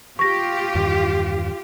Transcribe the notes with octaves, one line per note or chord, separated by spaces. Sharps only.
F4 G4 C#6 A#6
E2 G2 D#3